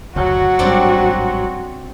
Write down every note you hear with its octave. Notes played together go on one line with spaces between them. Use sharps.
F#1 D2 F#3 F#4
A1 G#2 G3 C4 D4 D5